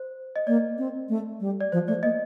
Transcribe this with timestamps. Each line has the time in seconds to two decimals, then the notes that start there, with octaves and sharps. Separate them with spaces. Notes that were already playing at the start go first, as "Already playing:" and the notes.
Already playing: C5
0.36 D#5
0.47 A#3 D5
0.78 C4
1.09 A3
1.40 G3
1.61 D5
1.72 F3 C5
1.88 A3 D5
2.03 A#3 D#5